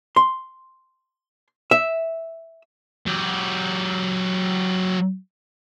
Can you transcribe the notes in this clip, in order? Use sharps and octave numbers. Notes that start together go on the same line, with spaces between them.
C6
E5
F#3 G4